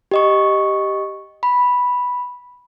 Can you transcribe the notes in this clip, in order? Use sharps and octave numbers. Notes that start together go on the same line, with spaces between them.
G4 D#5 C#6
B5